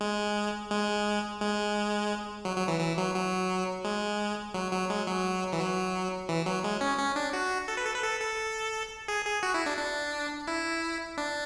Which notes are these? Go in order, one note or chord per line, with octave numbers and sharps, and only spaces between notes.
G#3
G#3
G#3
F#3
F#3
E3
E3
F#3
F#3
G#3
F#3
F#3
G#3
F#3
E3
F#3
E3
F#3
G#3
C#4
C#4
D4
F#4
A4
B4
A4
B4
A4
A4
G#4
G#4
F#4
E4
D4
D4
E4
D4